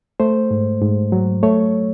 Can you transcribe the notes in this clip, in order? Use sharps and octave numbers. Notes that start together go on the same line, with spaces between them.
A3 C5
G#2
G#2
F#3
A3 C#5